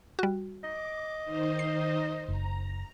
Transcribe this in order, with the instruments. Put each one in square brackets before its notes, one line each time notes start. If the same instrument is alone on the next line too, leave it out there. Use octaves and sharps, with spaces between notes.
[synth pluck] G3 F#4
[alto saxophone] D#5 [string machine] D6
[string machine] D#3 D#4 C5
[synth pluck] C7
[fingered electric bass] F#1 [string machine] A#5